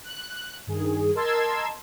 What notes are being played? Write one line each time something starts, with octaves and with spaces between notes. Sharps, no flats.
F#6
G2 D#3 G#4
A#4 D#5 A5 C6 E6 G#6